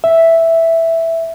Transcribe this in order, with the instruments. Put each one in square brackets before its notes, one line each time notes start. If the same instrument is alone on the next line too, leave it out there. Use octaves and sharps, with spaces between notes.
[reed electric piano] E5